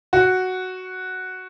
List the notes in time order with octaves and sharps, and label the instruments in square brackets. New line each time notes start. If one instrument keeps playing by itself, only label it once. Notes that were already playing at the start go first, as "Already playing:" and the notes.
[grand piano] F#4